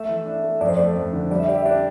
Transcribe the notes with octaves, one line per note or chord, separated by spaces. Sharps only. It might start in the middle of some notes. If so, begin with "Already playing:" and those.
Already playing: A3 E5
E3
D4
A3
F2 D5
C5
A3 D5
F2
D3
G3 D5
E5
G4 D5
E5
D4 D5